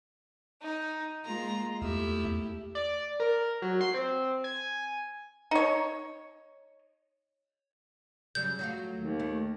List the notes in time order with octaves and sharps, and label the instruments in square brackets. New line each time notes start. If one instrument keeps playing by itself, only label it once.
[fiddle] D#4
[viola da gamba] G#3 A#3 F4 [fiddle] A#5
[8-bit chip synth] E2 [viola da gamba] A3 E4 G4 [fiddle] E5
[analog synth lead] D5
A#4
F#3
C6
C4
G#5
[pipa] D#4 C#5
[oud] C#3 F#3 G3 [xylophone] G6
[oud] F#3 A3 F4
[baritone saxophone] D#2
[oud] A3